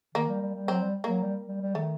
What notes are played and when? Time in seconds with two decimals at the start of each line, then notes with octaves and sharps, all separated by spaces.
0.15 D#3 A#3
0.29 G3
0.42 G3
0.55 G3
0.68 F#3 C4
0.82 G3
1.04 F#3 A#3
1.22 G3
1.48 G3
1.61 G3
1.75 D#3 A3